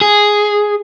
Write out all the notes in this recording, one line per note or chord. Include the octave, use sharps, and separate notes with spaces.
G#4